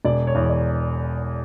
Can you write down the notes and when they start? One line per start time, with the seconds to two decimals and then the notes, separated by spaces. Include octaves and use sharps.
0.05 E1 D5
0.27 C#5
0.35 E2
0.50 D5